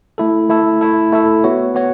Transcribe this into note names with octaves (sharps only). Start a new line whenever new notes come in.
A3 E4 A4
A3 E4 A4
A3 E4 A4
A3 E4 A4
B3 F#4 C#5
B3 F#4 C#5